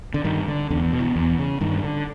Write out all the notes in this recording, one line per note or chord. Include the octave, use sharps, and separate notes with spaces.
D3
G2 D#3
D3
E2 D3
B2
E3
E2
C#3
G2 D#3
D3